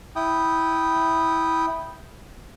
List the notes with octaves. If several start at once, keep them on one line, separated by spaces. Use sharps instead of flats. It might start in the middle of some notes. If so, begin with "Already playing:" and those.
E4 G5 D#6